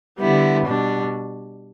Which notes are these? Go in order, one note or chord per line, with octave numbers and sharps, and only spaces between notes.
D3 G3 B3 E4
B2 G3 D4